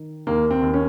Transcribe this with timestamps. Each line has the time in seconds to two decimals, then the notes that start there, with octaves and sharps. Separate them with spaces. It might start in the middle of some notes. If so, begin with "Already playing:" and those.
Already playing: D#3
0.27 D#2 A#3
0.51 C4
0.62 D#2
0.74 C#4